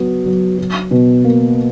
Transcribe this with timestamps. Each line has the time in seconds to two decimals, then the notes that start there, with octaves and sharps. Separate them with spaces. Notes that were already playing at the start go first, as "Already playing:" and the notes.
Already playing: F#3 B3 F#4
0.26 F#3
0.58 F#3
0.91 B2
1.24 A#3